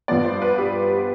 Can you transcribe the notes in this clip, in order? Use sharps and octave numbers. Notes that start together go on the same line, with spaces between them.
G2 F3 B3 D5
C5
B4
G4